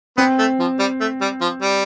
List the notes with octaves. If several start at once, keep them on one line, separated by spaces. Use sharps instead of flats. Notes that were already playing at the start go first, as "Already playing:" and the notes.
B3 C4
A3
F3
G3
A3
G3
F3
G3